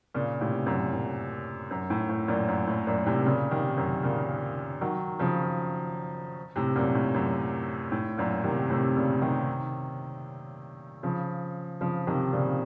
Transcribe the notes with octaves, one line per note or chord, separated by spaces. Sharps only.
A#2 C#3
A2 C3
F#2 A#2
A2
F#2
A2
A2
F#2 A#2
F#2
A2
F#2 A#2
A2 C3
A#2 C#3
C3 D#3
F#2
A#2 C#3
D#3 F#3
C#3 F3
A2 C3
F#2 A#2
A2
F#2
A2
F#2 A#2
C3 D#3
A2 C3
A#2 C#3
C3 D#3
C#3 F3
C#3 F3
C3 D#3
A#2 C#3